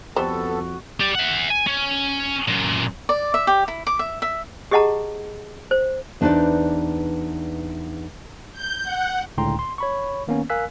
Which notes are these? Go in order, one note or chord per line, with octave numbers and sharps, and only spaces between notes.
F2 G3 B3 F#4 A4 C5
G4 D5
E5 F#5
G#5
C#4
F#2 A#2
D5
E5
G4
E4
D6
E5
E5
G4 G#4 D#5 F#5 A5 A#5
C5
E2 D4 D#4 B4 C5 D5
G6
F#5
C#2 A2 D3 G5 A#5 C6
C6
C#5 B5 C#6
D#3 A#3 B3 C#4
A#4 F5 G#5 E6 F#6 B6